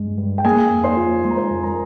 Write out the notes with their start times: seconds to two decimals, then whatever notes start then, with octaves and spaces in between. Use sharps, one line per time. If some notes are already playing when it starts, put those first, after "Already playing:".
Already playing: G2 G#3
0.18 G2
0.38 G5
0.45 A#3 G#4 G#5
0.70 F2
0.84 C5 C6
0.97 F4
1.24 G#3 C6
1.31 A#5
1.38 C5 C6
1.50 F2
1.63 A#4 A#5